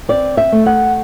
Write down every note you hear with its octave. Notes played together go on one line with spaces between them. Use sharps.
C4 D5
E5
A3
F#5